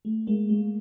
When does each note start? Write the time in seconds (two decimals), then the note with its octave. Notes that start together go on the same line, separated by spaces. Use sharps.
0.05 A3
0.27 G#3 A#3
0.49 G#3